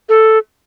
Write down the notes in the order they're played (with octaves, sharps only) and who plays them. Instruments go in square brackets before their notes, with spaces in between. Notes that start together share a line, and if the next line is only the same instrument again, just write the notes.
[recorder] A4